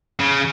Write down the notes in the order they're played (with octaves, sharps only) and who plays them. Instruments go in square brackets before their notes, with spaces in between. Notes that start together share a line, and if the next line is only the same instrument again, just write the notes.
[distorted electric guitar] C#3